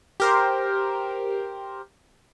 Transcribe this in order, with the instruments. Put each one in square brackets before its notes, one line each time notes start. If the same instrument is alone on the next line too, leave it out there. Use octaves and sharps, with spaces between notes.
[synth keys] G4 A#4 C5